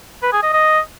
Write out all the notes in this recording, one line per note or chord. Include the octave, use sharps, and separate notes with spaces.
B4
G#4
D#5
D#5